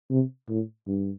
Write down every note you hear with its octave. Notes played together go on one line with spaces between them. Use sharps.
C3
A2
G2